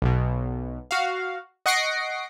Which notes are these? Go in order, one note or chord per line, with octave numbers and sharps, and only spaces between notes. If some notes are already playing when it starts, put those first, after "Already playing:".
B1 B2
F#4 F5
D#5 F#5 C#6 A#6 C7 D7